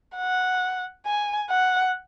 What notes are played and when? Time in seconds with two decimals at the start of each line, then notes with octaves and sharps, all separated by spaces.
0.17 F#5
1.06 G#5
1.50 F#5